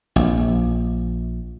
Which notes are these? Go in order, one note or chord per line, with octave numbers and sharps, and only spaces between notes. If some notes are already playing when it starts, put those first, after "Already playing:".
A#1